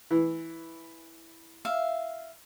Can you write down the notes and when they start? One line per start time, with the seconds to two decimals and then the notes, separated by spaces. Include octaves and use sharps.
0.11 E3
1.65 E5 F5